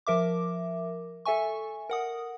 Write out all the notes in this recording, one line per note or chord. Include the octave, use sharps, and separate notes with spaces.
F3 A#4 E5 D6
A4 E5 G#5 C#6
A#4 F#5 D#6